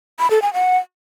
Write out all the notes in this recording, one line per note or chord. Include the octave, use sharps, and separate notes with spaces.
B5
A4
G#5
F#5